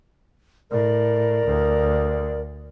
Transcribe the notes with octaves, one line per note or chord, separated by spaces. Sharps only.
A2 A#4 D5
D2